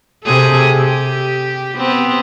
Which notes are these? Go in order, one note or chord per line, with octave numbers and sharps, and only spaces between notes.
C3 G#4 A4
G4
B3 C4